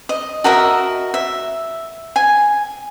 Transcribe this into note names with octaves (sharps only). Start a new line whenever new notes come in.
D#5
F#4 A#4 D#5 E5
E5
G#5